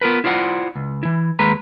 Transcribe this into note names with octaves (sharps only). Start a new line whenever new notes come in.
B3 F4 A#4 B4
E4 F4 C5 D5 F#5
C#2
E3 E4
D#2 G#3 B4 A#5